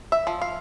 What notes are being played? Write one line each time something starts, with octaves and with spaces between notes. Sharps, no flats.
E5
F3
F5